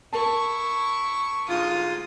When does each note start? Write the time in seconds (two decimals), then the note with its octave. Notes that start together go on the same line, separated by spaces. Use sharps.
0.13 E4 A#4 A5 C#6
1.48 D2 G#2 F4 D#6